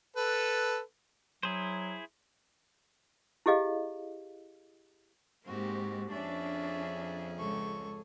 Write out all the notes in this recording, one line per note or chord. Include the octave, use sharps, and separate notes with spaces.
A4 B4
F#3 E4 G#4 C5
E4 G4 G#4 D#5 F5
G#2 A#3 C4 F#4 G4
F2 C#4 D4 G#4 E5
C#2 A4 C#6